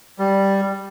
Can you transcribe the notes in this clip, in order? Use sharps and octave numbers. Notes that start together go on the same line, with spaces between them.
G3